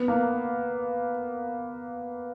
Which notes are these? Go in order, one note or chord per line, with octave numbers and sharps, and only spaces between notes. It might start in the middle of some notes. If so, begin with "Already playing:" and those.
Already playing: B3
A#3